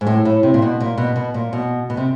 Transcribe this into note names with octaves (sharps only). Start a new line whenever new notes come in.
G#2
A2
A2
C3
A#2
B2
A#2
B2
B2
A#2
B2
B2
C3